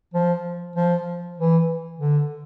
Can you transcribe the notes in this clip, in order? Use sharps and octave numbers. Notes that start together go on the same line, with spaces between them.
F3
F3
E3
D3